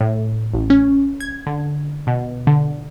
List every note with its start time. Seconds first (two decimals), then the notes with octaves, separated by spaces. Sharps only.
0.01 A2
0.54 A1
0.70 C#4
1.21 G#6
1.46 D3
2.07 B2
2.47 D3